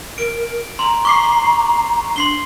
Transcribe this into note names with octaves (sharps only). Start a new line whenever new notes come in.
A#4 D7
A#5 C6
C#6 D6 C7 G7
D4 C6 C7 G7